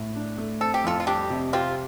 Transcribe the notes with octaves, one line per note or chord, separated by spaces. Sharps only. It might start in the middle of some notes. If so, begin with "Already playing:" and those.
Already playing: A2
D4
A3
C4 A4
G4
F2 F4 A4
F4
G3 D4 G4
C3
C4 F4 G4